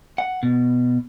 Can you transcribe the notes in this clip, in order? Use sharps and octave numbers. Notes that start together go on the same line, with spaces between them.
F#5
B2